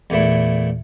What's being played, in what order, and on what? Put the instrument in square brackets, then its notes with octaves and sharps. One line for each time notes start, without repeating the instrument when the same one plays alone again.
[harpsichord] E2 A#2 A3 E4